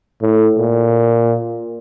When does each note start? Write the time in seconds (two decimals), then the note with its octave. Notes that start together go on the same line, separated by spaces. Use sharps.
0.22 A2
0.58 A#2